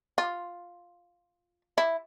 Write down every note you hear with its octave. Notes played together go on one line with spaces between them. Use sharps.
F4
E4